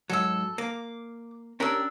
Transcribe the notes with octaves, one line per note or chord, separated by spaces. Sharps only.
G#2 F#3 A4 E6
A#3 D6
C#4 D4 G4 A#4 E6